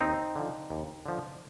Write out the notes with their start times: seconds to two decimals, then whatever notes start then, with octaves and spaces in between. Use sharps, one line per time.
0.01 D#2 C4 D#4
0.36 D3 F3
0.70 D#2
1.06 D3 F3